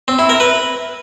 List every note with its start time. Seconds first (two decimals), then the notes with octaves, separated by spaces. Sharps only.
0.08 C4
0.19 E4
0.29 A#4
0.40 B4